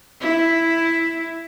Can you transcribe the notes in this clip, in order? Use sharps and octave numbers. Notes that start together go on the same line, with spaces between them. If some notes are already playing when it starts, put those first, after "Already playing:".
E4